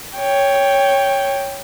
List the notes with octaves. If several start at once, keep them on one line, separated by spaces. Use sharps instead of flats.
C#5 G5